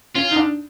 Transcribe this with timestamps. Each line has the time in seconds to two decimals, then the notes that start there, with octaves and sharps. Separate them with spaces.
0.16 C#4 F4
0.31 D#4
0.36 D4